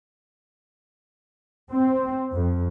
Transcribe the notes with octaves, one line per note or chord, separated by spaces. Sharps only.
C4
F2